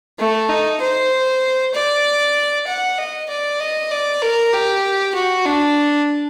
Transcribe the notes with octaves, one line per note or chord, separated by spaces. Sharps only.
A3
D#4
C5
D5
F#5
D#5
D5
D#5
D5
A#4
G4
F#4
D4